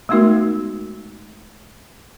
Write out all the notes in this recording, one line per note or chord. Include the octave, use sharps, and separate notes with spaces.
G#3 A3 B3 D#4 F#4 A#4